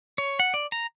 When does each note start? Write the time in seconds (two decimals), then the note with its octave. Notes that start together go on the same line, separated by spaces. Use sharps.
0.18 C#5
0.40 F#5
0.54 D5
0.72 A#5